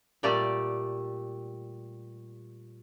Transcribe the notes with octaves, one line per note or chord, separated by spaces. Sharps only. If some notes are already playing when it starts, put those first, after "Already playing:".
A#2 G3 A3 G4 D5